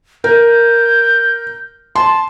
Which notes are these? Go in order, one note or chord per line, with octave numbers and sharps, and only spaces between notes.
A#4 G6
A5 C6